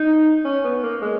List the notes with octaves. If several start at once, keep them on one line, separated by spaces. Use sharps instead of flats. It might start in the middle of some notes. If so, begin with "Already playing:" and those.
Already playing: D#4
C#4
B3
A#3
G#3